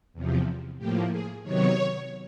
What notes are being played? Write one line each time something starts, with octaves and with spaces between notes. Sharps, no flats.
E2 C3 F3
A2 F3 A#3 G4
G#4
C3 D#3 F#3 B3 C#5